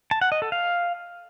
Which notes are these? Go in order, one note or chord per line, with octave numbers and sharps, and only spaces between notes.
A5
F#5
D#5
A4
F5